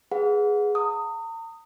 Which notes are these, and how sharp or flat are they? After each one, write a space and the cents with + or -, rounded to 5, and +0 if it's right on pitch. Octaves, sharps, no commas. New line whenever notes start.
G#4 +0 B4 +0 F#5 -30
A#5 -40 D#6 +0